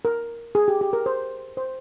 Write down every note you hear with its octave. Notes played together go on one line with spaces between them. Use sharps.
A#4
G#4
G4
G4
A#4
C5
C5